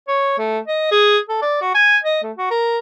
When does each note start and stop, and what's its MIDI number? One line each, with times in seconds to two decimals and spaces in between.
0.08 0.36 73
0.38 0.59 57
0.68 0.88 75
0.92 1.18 68
1.29 1.38 69
1.42 1.57 74
1.61 1.70 66
1.75 1.97 80
2.04 2.19 75
2.23 2.32 57
2.38 2.48 66
2.51 2.79 70